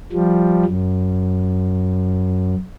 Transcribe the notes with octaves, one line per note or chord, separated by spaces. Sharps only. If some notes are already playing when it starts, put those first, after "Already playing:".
F3 G3
F#2